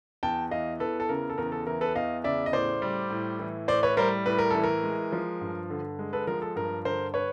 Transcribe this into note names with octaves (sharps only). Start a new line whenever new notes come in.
E2 G5 A5
E3 D#5 F5
E2 A4 B4
A4
C#3 A#4
A4
E2 A#4
A4
E3 A#4
A4 B4
E2 D#5 F5
C#3 D5 E5
D#5
A2 C5 D5
G3
A2
E3
A2 C5 D5
B4 C#5
G3 A#4 C5
A2 B4
A#4
E3 A4
A#4
G#3
F3
G2
D3
G#3
A4 B4
F3 A#4
A4
G2 A#4
D3 A#4 C5
B4 C#5